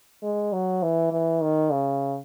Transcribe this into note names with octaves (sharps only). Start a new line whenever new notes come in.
G#3
F#3
E3
E3
D#3
C#3